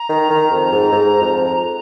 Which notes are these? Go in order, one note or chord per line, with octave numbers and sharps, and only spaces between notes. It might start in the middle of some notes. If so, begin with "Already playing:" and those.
Already playing: A#5
D#3
D#3
F2
G#2
G#2
F2